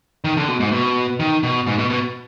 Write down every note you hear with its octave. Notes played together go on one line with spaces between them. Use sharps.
D#3
D3
B2
G#2
B2
D#3
B2
G#2
B2
B2